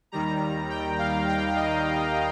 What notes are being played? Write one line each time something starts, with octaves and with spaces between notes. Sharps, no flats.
D#2 D#3 G3 A#5
G5
F5
G5
D#5